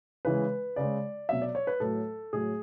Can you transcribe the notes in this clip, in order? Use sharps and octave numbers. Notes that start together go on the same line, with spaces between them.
C#3 E3 G#3 B4
C#3 G#3 D5
B2 F#3 E5
D5
C#5
B4
A2 F#3 A4
A2 F#3 G#4